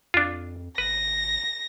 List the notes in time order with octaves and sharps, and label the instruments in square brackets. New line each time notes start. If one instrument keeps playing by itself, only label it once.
[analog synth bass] F2 [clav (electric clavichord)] D4 F4
[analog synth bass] G1 [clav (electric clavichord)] B4 [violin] A#6